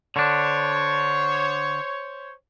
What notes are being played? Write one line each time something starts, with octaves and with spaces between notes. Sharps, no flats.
D3 D4 C5 C#5